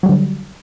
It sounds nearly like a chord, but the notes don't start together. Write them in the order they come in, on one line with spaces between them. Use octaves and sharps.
F#3 G3 D3